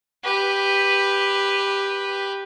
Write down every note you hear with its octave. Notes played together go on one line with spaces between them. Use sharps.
G4 B4